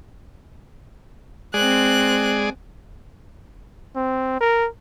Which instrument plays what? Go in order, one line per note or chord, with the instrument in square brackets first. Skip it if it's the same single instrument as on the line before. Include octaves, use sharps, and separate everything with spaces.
[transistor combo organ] G#3 G#4 D5 [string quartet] C4 F#6
[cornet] C4
A#4